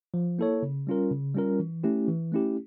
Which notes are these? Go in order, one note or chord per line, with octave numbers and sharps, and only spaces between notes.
F3
A#3 E4 A4 C#5
C#3
G3 C#4 F4 A#4
C#3
G3 C#4 F4 A#4
E3
A3 C#4 E4 G4
E3
A3 C#4 E4 G4